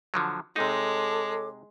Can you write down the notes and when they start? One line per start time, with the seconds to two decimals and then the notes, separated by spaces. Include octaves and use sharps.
0.14 D3 F3 F#3
0.56 C3 G#3 D#4 A4 C#5 D6